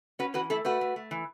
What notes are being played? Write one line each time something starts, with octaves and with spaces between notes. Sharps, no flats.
C#4 F#4 B4
E3 F#4 B4
A3 E4 A4
A3 F#4 B4
A3
A3
E3